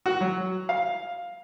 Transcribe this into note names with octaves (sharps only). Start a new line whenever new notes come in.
F#4
F#3
F5